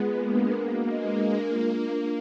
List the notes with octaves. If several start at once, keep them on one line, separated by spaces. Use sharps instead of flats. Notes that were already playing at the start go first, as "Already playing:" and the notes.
Already playing: G#3 B3 F4 G#4
A#3 B4
D4
A#4
F#4
G#3 D#5
D4
A#3 A#4
F4
D4
D4